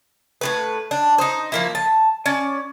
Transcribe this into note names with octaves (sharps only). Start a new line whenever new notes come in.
A2 C#3 B4
D4
D#4 C5
F3 A#3 E4
A5
C#4 D5